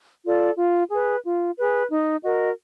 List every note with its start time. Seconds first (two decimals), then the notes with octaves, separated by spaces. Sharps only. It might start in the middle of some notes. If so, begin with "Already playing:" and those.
0.23 F4 A4 D5
0.56 F4
0.90 G#4 B4
1.23 F4
1.57 G#4 B4
1.89 D#4
2.23 F#4 A#4 D#5